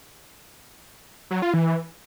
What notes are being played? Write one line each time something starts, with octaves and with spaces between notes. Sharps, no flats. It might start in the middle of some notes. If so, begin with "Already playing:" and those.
F#3
F4
E3